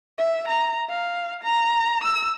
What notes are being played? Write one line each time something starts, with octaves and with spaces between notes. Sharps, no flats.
E5
A#5
F5
A#5
E6